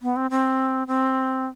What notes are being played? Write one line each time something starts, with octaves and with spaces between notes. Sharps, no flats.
B3
C4
C4
C4